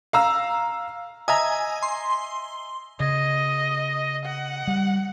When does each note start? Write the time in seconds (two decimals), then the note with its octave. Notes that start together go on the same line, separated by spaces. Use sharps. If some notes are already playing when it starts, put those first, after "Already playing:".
0.13 F5 A#5 E6
1.28 D#5 E5 G#5 A#5
1.82 C6
3.00 C#3 D#5
4.26 F#5
4.67 G3